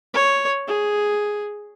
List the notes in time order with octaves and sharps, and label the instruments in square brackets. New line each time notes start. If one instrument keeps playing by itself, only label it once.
[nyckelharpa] C#5
G#4